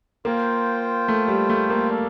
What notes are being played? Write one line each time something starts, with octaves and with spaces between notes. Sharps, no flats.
A#3 F4 C5 G5
A3
G3
A3
A#3
D4 A4 D5 F5